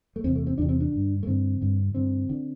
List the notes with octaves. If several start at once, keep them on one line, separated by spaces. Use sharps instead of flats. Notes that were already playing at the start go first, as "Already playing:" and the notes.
A3
E2 C3 C4
A3
C4
E2 C3 D4
C4
D4
G2 D3
A3
G2 D3 C4
G2 D3
G2 D3 C4
D3